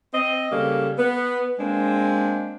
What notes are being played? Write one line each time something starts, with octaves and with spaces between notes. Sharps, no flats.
C4 D#5
C#3 G3 A#3 A4
B3
G#3 A#3 C4 D4